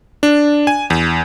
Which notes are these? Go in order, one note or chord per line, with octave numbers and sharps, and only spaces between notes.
D4
G#5
E2